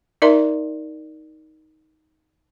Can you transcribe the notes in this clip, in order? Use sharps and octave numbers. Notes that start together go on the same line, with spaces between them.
D#4 A#4 D5 E5 A#5 C6